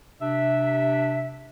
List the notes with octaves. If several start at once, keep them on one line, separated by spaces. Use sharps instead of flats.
C3 D4 E5